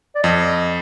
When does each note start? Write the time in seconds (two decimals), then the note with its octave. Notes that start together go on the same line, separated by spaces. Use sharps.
0.15 D5
0.23 F2 D#5